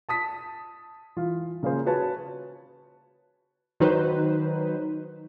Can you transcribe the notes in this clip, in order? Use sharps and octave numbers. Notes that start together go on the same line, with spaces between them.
A5 D#6 B6
E3 F4
C#3 A#3 C#4 G#4 C5
F#4 B4 C#5 A5
D#3 F#3 D#4 B4 C5